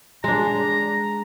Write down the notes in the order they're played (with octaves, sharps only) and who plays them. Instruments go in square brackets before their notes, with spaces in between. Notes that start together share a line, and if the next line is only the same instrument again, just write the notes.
[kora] G#3 D4 [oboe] A#5